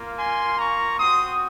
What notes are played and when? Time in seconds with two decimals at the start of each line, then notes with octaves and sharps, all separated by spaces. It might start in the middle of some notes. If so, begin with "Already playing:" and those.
Already playing: A#3 F4
0.17 G#5 C6
0.58 A#5 C#6
0.99 C4 F#4 C6 D#6